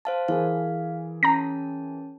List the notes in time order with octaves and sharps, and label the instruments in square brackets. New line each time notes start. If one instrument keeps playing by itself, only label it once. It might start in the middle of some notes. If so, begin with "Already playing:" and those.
[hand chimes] C5 F5 A5
[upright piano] E3 G#4 A#4 [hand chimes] F5
[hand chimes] C#4 A5 [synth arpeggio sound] A#5 A#6